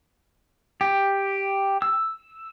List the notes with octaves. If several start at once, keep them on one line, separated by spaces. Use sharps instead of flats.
G4
E6